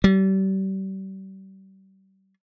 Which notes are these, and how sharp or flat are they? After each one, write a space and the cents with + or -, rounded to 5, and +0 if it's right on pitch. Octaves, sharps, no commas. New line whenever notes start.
G3 -35